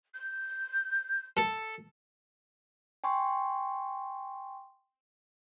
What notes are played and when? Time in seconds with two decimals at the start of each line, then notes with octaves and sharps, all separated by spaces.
0.14 G6
1.37 A4
3.04 G5 G#5 C6 C#6